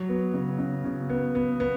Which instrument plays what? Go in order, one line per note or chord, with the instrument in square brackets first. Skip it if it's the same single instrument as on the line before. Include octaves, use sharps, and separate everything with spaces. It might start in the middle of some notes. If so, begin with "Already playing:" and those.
Already playing: [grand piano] F#3
B3
C#3
C#3
C#3
B3
B3
B3